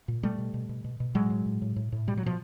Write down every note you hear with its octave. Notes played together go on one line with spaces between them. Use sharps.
A#2
B2 G3 A3
B2
B2
B2
B2
B2
A2 F#3 G#3
A2
A2
A2
A2
A2
B2 G3
F#3
B2 F3